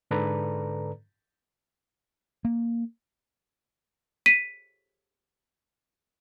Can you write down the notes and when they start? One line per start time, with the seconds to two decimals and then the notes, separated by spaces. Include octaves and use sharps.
0.11 G#2 D3 A4 B4 D5 A#5
2.45 A#3
4.26 B6 D#7